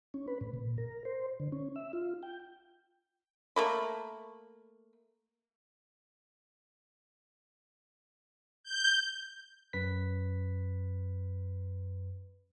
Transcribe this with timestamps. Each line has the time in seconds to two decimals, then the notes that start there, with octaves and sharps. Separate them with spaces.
0.14 C#4
0.28 B4
0.41 A2
0.54 A#2
0.78 A#4
1.05 C5
1.40 D3
1.52 C#4
1.76 E5
1.93 F4
2.23 G5
3.56 A3 A#3 B5
8.64 G6
9.73 F#2 B4 B6